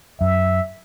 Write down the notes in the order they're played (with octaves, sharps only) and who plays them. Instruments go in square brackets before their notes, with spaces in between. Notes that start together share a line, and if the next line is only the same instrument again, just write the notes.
[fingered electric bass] F#2 [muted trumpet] E5